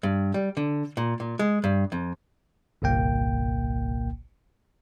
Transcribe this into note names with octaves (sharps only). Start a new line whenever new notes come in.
G2
G3
D3
A#2
A#2
G#3
G2
F2
G1 C2 A#2 A#3 G5